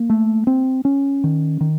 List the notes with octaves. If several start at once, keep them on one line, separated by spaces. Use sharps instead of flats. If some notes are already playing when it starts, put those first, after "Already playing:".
Already playing: A#3
A3
C4
C#4
D#3
D#3